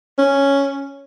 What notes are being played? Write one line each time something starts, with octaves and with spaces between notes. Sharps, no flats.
C#4